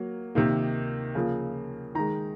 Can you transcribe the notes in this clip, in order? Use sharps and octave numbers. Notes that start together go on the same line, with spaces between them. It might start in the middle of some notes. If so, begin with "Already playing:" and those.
Already playing: F#3 A#3
C3 D#3 A#3
C#3 F3 A#3
D#3 G#3 A#5